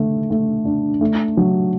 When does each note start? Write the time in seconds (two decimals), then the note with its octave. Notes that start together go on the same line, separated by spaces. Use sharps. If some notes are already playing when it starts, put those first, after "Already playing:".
Already playing: D3 A3
0.30 A3
0.65 D4
1.01 A3
1.37 F#3